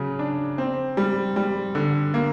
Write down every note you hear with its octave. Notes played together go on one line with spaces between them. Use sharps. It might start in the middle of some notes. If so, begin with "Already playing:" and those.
Already playing: C#3 F#3
D4
C4
G3
G3
D3
A#3